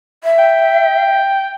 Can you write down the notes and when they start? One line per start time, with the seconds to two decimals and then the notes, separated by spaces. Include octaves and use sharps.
0.24 E5
0.39 G5